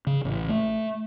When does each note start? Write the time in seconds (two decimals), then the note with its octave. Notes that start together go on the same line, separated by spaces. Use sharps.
0.07 C#3
0.25 A1
0.49 A3